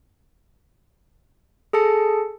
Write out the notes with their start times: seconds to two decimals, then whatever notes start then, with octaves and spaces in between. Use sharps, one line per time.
1.73 G#4 A4 A5 C#7